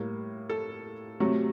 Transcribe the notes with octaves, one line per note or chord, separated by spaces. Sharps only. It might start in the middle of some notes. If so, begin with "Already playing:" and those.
Already playing: A2 G3 A#3
A4
C3 F#3 A3